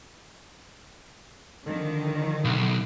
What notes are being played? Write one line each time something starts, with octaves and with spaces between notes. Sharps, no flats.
D3 D#3 F3
B1